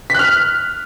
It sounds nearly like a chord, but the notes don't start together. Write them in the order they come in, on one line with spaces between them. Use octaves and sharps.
B6 F#6 F6